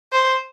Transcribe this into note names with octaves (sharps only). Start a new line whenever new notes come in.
C5